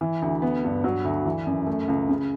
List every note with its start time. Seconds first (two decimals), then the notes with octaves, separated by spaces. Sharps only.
0.01 E3
0.22 D2
0.42 B3
0.64 G2
0.84 F#3
1.05 D2
1.25 E3
1.47 F#2
1.67 A3
1.88 C#2
2.09 C#3